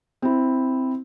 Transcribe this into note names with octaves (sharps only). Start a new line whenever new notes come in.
C4 E4